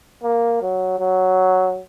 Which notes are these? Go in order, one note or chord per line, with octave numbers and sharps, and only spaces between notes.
A#3
F#3
F#3